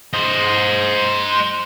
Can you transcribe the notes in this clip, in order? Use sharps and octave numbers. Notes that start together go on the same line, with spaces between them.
C5 D#5